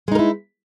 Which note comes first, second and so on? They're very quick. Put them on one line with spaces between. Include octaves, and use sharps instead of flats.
G#3 D#4 A#4 E4